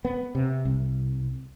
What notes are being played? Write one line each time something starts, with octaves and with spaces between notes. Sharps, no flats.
B3
C3
C2